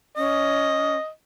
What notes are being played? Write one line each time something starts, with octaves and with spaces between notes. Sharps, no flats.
C#4 D#5